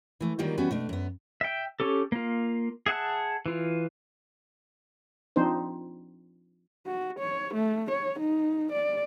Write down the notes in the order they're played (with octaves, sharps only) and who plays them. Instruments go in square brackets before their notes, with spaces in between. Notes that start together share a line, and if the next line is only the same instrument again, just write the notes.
[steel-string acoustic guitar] E3 A3
D3 D#3 F#3 G3 A#3 F4
E3 G3 B3 C#4 F#4 B4
B2 A3 D4
F#2 B3
[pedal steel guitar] E5 G5
C#4 G4 A4
A#3 F4
G#4 E5 F#5 A5
E3 F4
[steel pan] F3 C4 D4 D#4 C5
[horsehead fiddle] F#4
C#5
A3
C#5
D#4
D5